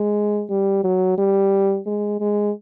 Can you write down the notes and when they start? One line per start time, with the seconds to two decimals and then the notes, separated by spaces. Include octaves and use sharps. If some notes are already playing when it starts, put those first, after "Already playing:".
Already playing: G#3
0.50 G3
0.84 F#3
1.18 G3
1.86 G#3
2.21 G#3